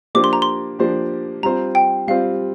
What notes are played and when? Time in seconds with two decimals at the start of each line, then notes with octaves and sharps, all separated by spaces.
0.15 F3 A#3 D4 G4 C5 D6
0.24 C6
0.33 A#5
0.42 C6
0.79 F3 A#3 D4 G4 C5
1.43 G3 C4 F4 C5 A#5
1.75 G5
2.08 G3 C4 F4 C5 F5